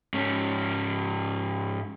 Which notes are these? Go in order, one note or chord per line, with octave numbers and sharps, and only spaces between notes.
G#2 C#4